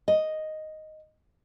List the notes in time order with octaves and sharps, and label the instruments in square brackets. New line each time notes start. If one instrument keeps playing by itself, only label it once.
[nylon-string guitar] D#5